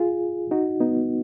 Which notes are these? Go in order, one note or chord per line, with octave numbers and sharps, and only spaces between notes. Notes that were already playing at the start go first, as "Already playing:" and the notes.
Already playing: F4 G#4
D#4 F#4
B3 D#4